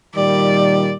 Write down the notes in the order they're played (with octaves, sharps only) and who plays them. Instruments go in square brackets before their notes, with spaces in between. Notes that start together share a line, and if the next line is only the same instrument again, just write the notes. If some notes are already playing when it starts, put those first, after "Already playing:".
[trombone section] A#2 D#3 G3 [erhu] D5